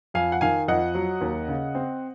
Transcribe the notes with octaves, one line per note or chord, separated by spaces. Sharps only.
F2 F5 G#5
F#5
D#3 F5 G#5
F2 D#5 F#5
F#3
D#2
C#3
C4